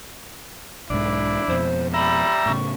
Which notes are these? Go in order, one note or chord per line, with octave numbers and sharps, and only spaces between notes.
B1 G#2 D4 E4
F2 B2 C5
G3 E5 A#5 B5
A2 C#3 C#6